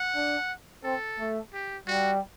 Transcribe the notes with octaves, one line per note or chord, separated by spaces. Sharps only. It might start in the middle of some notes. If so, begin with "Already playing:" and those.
Already playing: F#5
D4
C4 A4
A3
G4
G3 F#4